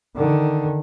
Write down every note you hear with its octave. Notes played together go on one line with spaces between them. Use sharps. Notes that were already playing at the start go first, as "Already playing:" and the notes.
D3 D#3